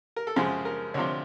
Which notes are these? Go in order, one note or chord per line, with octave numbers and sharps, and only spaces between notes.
A#4
A4
F#2 C#3 F3 G#3 G#4
A#4
D2 C3 F3 C#5